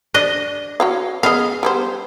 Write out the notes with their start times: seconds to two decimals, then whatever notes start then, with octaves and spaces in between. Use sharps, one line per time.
0.14 D4 D#5
0.80 F#4 C#5 F5
1.23 B3 G#4 D#5 F5
1.63 G3 B3 C5